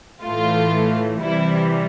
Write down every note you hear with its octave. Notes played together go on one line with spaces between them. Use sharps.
A2 E3 A3 F4
C3 E3 G3 E4